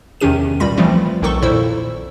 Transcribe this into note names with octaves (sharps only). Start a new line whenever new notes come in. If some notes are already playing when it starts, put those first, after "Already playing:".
E2 C3 D#3 C#4 G4 D#7
C#2 A#2 G3 B5 A#6
E3 F3 G3 A3 C4 F4
B1 D#3 D#4 A4 C#6
F2 A#2 E4 C5 E6